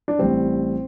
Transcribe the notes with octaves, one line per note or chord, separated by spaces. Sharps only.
D4
A1 A2 G3 C4